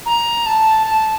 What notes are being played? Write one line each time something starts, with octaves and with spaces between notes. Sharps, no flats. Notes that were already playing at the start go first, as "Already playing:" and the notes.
A#5
A5
A5